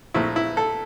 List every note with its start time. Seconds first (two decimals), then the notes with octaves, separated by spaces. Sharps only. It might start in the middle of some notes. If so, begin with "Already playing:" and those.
0.14 A#1 A#2 A3 C4 E4
0.36 E4
0.57 A4